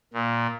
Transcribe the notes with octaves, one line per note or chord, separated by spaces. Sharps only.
A#2